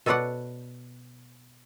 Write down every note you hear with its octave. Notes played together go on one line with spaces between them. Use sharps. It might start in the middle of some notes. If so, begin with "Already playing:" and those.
B2 A4 B4 C#5 D5 F#5